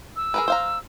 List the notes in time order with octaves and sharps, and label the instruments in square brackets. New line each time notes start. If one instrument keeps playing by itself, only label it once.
[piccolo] E6
[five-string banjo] G#4 A#4 B4
C5 F5 A#5